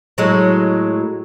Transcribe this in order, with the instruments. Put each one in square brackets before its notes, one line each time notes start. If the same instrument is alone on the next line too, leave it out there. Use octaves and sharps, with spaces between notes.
[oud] A2 F#3 G#3